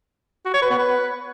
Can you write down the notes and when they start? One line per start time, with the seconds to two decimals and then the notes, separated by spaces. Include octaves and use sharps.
0.46 F#4
0.54 C#5
0.62 B4
0.70 B3
0.79 B4